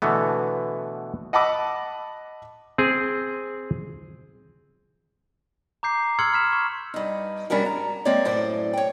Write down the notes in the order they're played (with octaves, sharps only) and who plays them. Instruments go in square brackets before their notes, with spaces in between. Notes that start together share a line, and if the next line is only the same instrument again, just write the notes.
[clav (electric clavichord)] B2 D3 E3 A3 B3
[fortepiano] D#5 F#5 A5 B5 D6 E6
[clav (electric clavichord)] C4 G#4
[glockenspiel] A#5 D6 G6 C7
C6 E6 F6 G#6 C#7 F#7
B5 F6 B6 E7
C#6
[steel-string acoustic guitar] G2 D#4
G3 C#4 D4 F#4 A#4
G#2 A#5
G#3 A#3 C4 A#4 C#5 D5
F#2 A2 C5 D5
C#5 G5